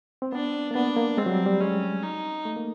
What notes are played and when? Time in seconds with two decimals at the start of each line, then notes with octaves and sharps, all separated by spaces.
0.22 C4
0.33 B3 D4
0.71 A#3
0.75 B3 D4
0.97 A#3
1.17 G#3 C4
1.26 F#3
1.32 G3
1.46 G3
1.60 G#3 C#4
2.03 D#4
2.45 A3
2.57 A#3